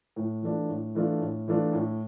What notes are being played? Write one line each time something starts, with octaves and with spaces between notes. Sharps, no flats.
A2
E3 A3 D4 F4
A2
E3 A3 D4 F4
A2
E3 A3 D4 F4
A2